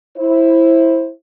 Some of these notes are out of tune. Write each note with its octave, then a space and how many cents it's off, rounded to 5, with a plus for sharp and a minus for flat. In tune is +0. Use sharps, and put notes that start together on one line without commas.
E4 +0 C5 +20